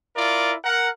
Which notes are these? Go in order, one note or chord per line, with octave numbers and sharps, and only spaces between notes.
E4 F4 A#4 D5
A#4 F#5